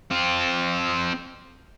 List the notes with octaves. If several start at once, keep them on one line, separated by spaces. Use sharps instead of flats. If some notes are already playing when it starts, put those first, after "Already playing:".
C4 F4